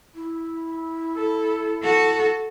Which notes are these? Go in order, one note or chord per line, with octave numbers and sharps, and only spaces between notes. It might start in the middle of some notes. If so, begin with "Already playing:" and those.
E4
A4
F#4 A4